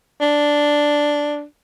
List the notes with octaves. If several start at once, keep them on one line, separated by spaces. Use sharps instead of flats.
D4